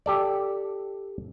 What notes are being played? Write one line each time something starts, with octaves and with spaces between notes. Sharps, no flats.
G4 A4 D5